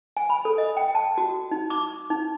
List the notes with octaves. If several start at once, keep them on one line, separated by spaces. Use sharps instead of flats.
G#5
B5
A4
D#5
G5
A5
F#4
D#4
D6
D#4